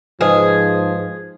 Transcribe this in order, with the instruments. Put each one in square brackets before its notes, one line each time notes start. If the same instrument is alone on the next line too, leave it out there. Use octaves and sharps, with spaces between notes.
[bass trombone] G#2 [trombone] F3 [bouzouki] G#4 [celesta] B4 C5 D#5